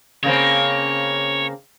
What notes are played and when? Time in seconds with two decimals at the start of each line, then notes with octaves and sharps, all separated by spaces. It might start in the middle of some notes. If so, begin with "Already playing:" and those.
0.23 C#3 A#3 C4 C#5